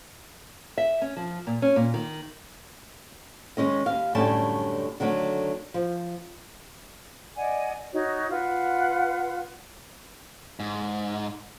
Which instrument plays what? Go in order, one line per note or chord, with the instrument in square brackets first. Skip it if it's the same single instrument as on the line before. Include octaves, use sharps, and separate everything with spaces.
[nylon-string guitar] E5
C#4
F3
A#2
C#4
A#2
D#3
D#3 G#3 C#4 D#5
D#2 F5
F#2 A2 D3 G3 C#4 A5
D3 D#3 F#3 A3
F3
[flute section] D5 D#5 F#5 G#5
D#4 F#4 C#5
F4 B4 F5 F#5
[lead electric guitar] G#2